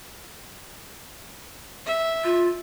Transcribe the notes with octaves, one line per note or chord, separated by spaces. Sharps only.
E5
F4